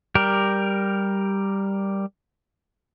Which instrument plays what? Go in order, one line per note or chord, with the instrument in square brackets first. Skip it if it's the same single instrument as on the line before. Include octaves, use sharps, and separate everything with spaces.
[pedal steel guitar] G3 G4 A#4